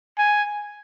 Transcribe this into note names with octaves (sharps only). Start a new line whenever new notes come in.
G#5